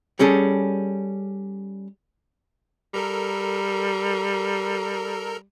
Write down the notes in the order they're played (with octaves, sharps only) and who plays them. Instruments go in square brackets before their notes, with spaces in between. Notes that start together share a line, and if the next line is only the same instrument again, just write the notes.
[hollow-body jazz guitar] G3 C#4 G#4 A4
[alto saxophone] G3 [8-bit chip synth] A4 A#4 A#5